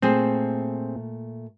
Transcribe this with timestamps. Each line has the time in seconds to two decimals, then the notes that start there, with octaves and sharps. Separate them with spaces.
0.02 A#2 A3 C4 G#4 C5